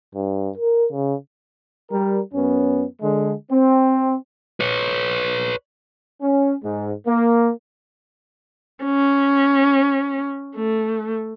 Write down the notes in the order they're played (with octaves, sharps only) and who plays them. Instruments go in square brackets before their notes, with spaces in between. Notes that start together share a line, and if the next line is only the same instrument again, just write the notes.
[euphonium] G2
A#4
C#3
[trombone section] G3 A#4
F#2 B3 C#4
D3 G#3
C4
[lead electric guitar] B4 C#5
[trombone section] C#4
G#2
A#3
[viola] C#4
A3